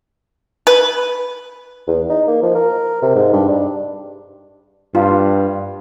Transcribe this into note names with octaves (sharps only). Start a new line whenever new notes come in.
B4
E2
D#4
A#3
F3
A#4
C3
G#2
G2
D4
G2 F4